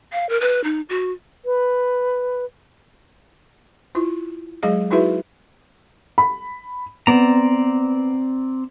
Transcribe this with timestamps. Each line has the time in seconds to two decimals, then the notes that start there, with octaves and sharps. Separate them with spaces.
0.12 F5
0.29 A#4
0.41 B4
0.64 D#4
0.89 F#4
1.45 B4
3.95 E4 F4
4.63 F#3 G#3 G#4 D#5 F5
4.91 D#4 E4 F#4 G#4 B4 E5
6.18 B5
7.07 B3 C4 D5 A#5